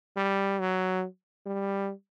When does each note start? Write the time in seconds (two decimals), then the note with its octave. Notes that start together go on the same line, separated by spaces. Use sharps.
0.17 G3
0.60 F#3
1.46 G3